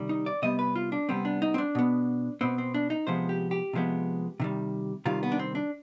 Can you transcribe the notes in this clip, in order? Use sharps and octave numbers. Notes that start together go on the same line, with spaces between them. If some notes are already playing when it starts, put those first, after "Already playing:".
Already playing: C3 D#3 G3
D#4
D5
C3 G3 B3 D#5
B4
F4
D4
C3 G3 B3 C4
D4
D#4
C4
D4
B2 B3
B2 B3 C4
C4
D4
D#4
C3 F3 G#3 B3 C5
G4
G4
C3 F3 G#3 B3
C3 D#3 G3
C3 D#3 G3 F4
B3
D4
C4
D4